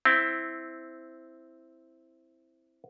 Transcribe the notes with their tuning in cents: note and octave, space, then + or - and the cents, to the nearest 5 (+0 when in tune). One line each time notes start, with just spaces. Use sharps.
C4 +0 E4 +0